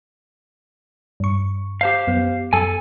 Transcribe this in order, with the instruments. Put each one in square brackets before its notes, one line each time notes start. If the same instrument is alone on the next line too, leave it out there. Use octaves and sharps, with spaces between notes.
[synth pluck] G2 C#6
[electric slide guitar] G4 C5 F5
[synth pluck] F#2 B3
[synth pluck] F#2 [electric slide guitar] A4 G#5